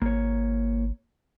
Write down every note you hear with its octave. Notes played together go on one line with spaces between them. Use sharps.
G#1 A#3 C#5